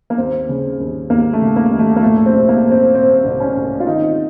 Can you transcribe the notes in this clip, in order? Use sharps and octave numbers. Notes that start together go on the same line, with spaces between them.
A#3
D#2 C4
C#3
D#2
D#2 A#3
A3
C#3
A#3
D#2
A3
A#3
A#2 A3
C4
C2
A#3
A#2
C4
A#2 C4
C2
C#4
C2
F4
D#3 D#4